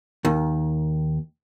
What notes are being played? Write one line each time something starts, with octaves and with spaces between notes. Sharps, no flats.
D#2 D#3